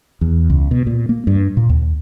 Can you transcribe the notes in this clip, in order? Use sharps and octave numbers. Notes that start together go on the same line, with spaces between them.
E2
C#2
B2
A#2
A#3
G2
A#2
D#2